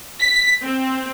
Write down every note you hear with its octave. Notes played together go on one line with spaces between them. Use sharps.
B6
C4